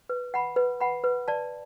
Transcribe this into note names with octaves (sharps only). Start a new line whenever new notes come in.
B4
F#5 B5
B4
F#5 B5
B4
D5 A5